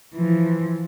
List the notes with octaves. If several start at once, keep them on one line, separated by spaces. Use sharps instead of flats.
E3 F3